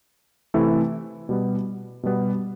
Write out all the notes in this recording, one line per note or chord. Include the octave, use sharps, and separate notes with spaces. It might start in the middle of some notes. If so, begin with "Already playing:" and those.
C3 E3 A3 E4 A4
B2 G3 B3
B2 G3 B3